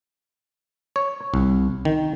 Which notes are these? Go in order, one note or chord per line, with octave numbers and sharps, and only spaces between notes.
C#5
C2
D#3